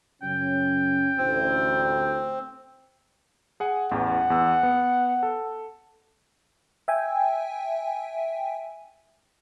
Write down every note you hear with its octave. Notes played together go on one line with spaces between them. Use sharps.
F#2 C#3 C#4 G5
A1 D2 C4
G#4 F#5 G#5
A1 E2 F#5 G5
E2 B3 E6
B3
A4
E5 G5 G#5